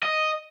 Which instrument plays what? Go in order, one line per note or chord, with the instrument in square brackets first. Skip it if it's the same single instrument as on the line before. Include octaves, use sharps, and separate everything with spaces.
[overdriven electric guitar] D#5